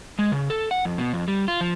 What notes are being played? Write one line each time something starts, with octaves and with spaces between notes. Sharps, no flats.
G#3
C#3
A4
F#5
F2
B2
F2
G3
F4
F3